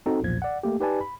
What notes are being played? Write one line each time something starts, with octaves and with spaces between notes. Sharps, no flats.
C4 D#4 F#4 A4
B1 E2 A#2 F3 G#6
D5 F#5
A3 A#3 G4
D#4 G4 B4 D5 G#5 A5
B5